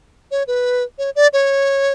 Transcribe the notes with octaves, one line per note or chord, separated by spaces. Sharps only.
C#5
B4
C#5
D5
C#5